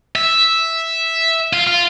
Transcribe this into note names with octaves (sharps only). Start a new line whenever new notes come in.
E5
F4
F4